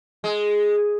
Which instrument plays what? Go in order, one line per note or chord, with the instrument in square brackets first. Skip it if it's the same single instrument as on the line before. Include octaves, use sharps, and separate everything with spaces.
[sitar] G#3